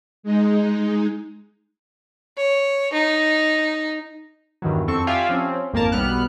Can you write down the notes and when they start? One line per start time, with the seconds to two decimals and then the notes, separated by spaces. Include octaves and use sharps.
0.23 G#3 D#4
2.37 C#5
2.93 D#4
4.62 E2 G2 D#3 E3 F#3
4.87 F2 C4 A4 C#6
5.07 F4 G4 D5 E5 F5 G#5
5.29 F3 C4 C#4
5.72 G#1 F2 A#3 A#4 A5
5.92 B1 G3 B3 F6 F#6